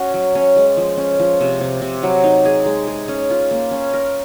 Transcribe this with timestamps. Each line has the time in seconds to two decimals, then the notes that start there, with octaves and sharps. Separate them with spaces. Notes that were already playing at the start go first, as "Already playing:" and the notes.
Already playing: C#4 F#4
0.14 F#3
0.35 C#4
0.56 G#3
0.77 F3
0.97 C#4
1.20 F3
1.41 C3
1.61 C3
1.82 C3
2.03 F#3
2.24 D#4
2.45 G#4
2.66 G#3
2.87 G#4
3.08 C#4
3.30 F4
3.51 A#3
3.71 C#4
3.94 A#4